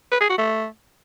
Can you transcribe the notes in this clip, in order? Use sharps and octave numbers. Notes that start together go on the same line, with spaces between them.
B4
G#4
F#4
A3